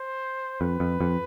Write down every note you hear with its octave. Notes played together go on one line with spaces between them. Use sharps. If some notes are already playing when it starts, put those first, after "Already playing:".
Already playing: C5
F2 B4
F2
F2